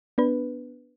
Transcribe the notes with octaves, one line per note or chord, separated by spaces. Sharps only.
B3 D4 B4